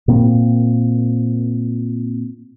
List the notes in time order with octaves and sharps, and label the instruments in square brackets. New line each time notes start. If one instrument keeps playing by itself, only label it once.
[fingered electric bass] A#2 A#3 C4